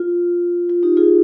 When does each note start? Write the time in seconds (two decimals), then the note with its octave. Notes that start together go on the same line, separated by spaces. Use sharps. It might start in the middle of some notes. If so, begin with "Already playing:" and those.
Already playing: F4
0.70 F4
0.83 D#4 G4
0.97 F4 G#4